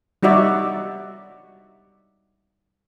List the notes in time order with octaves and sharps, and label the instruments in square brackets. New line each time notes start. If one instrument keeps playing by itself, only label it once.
[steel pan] G3 D#4 F#4 D5 E5